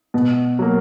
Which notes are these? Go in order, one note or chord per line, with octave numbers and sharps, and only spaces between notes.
B2
F#3 A#3